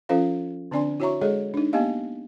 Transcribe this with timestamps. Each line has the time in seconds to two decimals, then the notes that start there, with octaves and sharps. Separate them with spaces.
0.09 F3 C#4 F4 A4 C5 F5
0.71 D3 C4 D4 D5 G#5 C6
1.00 E4 F#4 C#5 E5 A#5 C#6
1.21 G#3 G#4 A4 C#5 D#5
1.54 D4 D#4
1.73 A#3 B3 G4 D#5 F5